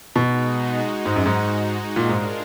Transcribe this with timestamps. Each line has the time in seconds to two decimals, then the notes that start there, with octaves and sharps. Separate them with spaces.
0.16 B2 G#3 D#4 F#4
1.06 G#2
1.16 F#2
1.26 G#2
1.96 A#2 G#3 D4 F4 A#4
2.09 G#2